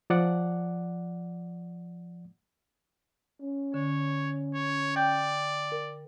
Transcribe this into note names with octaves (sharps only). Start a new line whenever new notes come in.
F3 D5 F#5
C#4
D3 C#5
C#5
D5 G5 G6
A#4